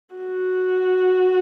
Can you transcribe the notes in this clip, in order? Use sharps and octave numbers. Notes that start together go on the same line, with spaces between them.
F#4